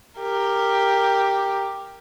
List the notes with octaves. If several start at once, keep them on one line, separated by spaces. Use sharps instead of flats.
G4 A#4